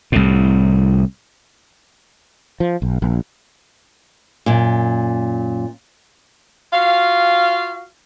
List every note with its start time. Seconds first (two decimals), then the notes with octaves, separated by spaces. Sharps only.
0.12 C2 A2
2.60 F3
2.82 B1
3.02 A#1
4.46 F#2 A#2
6.73 F4 F#4 F5